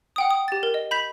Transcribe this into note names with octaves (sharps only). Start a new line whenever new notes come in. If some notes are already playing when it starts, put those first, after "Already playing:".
F#5 G5 D#6
D#6
G4 A6
A#4
D#5
B5 G6 B6 F7